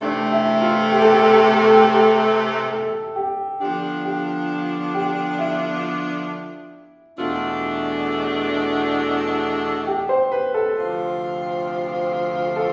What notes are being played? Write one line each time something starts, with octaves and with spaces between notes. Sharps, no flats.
C3 E3 A3 D4
E4
F4
G4
A4
G4
A4
G4
A4
G4
A4
G4
A4
G4
A4
G4
D3 F3 B3 D4 G4
G4
G4
E4
E2 B2 A3 D4 F4
G4
C5
B4
A4
D2 C3 F3 C4 F4
A4